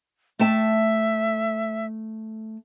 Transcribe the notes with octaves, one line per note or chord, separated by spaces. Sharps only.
A3 E5 G5 A5